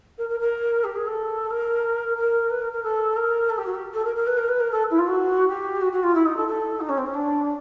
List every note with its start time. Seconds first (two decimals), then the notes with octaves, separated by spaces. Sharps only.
0.18 A#4
0.29 A#4
0.40 A#4
0.84 G4
0.96 G#4
1.07 A4
1.50 A#4
2.17 A#4
2.50 B4
2.61 A#4
2.72 A#4
2.83 A4
3.16 A#4
3.49 A4
3.58 G4
3.66 F#4
3.74 G4
3.93 A4
4.05 A#4
4.16 A#4
4.27 B4
4.38 A#4
4.48 B4
4.60 A#4
4.71 A4
4.90 E4
4.99 F4
5.07 F#4
5.48 G4
5.81 F#4
5.92 F#4
6.03 F4
6.14 E4
6.25 D#4
6.37 A4
6.48 A4
6.80 D#4
6.89 C#4
6.97 C4
7.06 C#4
7.14 D4